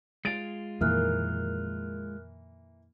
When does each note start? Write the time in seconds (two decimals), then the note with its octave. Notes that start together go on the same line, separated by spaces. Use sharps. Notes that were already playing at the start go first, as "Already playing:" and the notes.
0.25 G#3 F4 A6 D7
0.81 F2 A#2 D#3 E3 A#3 A#4 F6 F#6